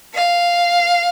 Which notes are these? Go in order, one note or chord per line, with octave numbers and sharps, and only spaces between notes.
F5